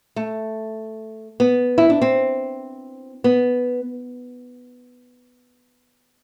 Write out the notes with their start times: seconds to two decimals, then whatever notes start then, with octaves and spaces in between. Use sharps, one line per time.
0.16 A3
1.40 B3
1.78 E4
1.90 D4
2.02 C4
3.24 B3